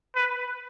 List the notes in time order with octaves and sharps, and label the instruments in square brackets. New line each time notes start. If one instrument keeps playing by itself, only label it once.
[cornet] B4